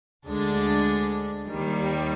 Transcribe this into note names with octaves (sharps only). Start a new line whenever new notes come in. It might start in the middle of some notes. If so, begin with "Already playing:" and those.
D2 D3 G#3 D4
D#2 D#3 G3